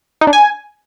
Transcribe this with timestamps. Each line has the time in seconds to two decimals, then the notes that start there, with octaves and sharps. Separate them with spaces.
0.21 D#4
0.27 D4
0.33 G#5